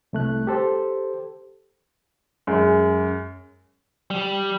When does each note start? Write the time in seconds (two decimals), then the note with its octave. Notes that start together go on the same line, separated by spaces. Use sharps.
0.13 C2 A3 F#6
0.47 G4 A4 C5
2.47 F#2 G#3
4.11 G3